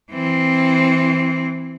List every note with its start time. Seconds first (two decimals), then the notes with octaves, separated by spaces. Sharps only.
0.11 E3 C4